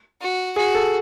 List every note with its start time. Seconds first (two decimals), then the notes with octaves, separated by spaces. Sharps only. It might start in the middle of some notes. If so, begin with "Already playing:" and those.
0.21 F#4
0.56 F#4 G#4
0.75 A4